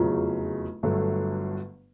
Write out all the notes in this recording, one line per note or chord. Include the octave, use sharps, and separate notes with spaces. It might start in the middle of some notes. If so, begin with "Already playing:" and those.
Already playing: F1 E2 C#3 F#3 F4
G1 G2 D3 F#3 A3